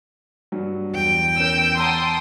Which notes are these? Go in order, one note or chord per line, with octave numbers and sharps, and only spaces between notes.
G2 F#3
E2 G5
C#4 A#4 E6 G6
F#5 A5 A#5 C6 D#6 E6